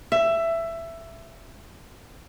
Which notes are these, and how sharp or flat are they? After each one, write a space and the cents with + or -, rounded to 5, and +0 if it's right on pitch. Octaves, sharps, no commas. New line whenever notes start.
E5 +15